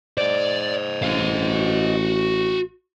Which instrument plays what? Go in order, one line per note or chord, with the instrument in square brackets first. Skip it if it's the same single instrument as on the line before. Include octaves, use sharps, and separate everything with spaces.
[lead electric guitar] C5 D#5 [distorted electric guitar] D5
[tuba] A1 [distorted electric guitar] F#4 F5